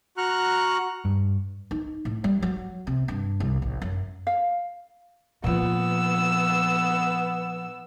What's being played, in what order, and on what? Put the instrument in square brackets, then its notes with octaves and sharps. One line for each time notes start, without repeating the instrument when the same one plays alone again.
[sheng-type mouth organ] F#4 A#5 C#6 F6 F#6
[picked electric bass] G2
[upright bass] D#4
A2
G3
F#3
C3
G2
C2
A1
F#2
[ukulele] F5
[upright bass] A#2 F3 [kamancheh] B3 E6